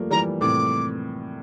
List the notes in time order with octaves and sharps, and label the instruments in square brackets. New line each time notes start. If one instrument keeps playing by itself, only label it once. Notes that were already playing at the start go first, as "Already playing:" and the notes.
Already playing: [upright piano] F3 G3 A3 A#3
[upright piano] E3 G3 [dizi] A#5
[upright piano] A2 C3 [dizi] D6